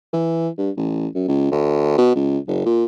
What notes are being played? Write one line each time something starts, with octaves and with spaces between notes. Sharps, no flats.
E3
G2
A1
F#2
C#2
D2
B2
C#2
F#1
A#2